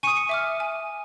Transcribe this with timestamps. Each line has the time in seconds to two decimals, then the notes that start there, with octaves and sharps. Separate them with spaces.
0.03 G#5 C#6 D#6 C#7 D#7
0.17 C#7
0.29 E5 D6 F6
0.60 G#5